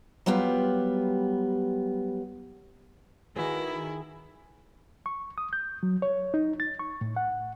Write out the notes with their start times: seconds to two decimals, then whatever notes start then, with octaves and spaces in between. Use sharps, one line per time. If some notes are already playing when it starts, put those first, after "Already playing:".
0.26 F#3 G3 B3 F4 G4
3.36 D#3 E4 F#4 G#4 B4 D5
5.06 C#6
5.38 D#6
5.53 G6
5.83 F#3
6.02 C#5
6.34 D#4
6.60 A6
6.79 C#6
7.01 A2
7.16 F#5